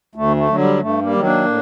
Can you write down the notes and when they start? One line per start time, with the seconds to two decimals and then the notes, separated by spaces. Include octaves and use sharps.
0.15 D2 A3
0.37 A3
0.48 D3 F#3
0.59 G3
0.80 G2 A3
1.02 G3 A#3
1.13 D#3 F#3
1.24 A#3 D4
1.45 A2